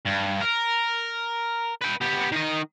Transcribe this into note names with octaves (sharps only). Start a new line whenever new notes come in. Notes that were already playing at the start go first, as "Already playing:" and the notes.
G2
A#4
B4 G5
B3 G4
D#3 D#5